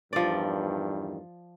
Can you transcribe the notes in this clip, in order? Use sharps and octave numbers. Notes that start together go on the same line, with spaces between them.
E2 G2 D#3 F3 D5